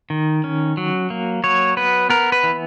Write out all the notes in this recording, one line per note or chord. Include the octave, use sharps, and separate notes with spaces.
D#3
C#4
F#3
A#3
F#3 C#5
B3 B4
B3 A#4
B4
E3